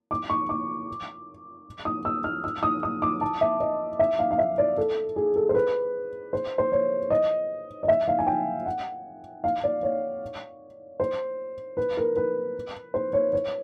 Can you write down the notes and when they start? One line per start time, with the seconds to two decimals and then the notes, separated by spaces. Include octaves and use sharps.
0.11 D6
0.30 C#6
0.49 D6
1.85 D#6
2.05 E6
2.24 F6
2.44 E6
2.63 D#6
2.83 D#6
3.02 D6
3.21 A5
3.41 E5
3.60 D#5
3.99 E5
4.19 F5
4.31 F5
4.38 E5
4.58 D5
4.77 A4
5.16 G#4
5.36 A4
5.49 C5
5.55 B4
6.33 C5
6.58 C5
6.72 C#5
7.10 D#5
7.83 D#5
7.88 E5
8.08 F5
8.19 G#5
8.27 G5
8.66 F#5
9.44 F5
9.64 D5
9.83 C#5
11.00 C5
11.77 B4
11.97 A#4
12.16 B4
12.94 C5
13.13 C#5
13.33 C#5